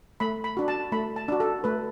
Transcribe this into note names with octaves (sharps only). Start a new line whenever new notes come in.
A3 B5
B5
D4 F#4
A5
A3 B5
A5
D4 F#4
A4
A3 B4